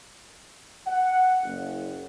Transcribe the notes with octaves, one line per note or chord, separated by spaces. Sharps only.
F#5
F#1